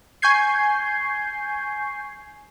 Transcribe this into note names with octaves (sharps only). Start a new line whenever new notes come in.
G#5 C#6 G6 G#6 C7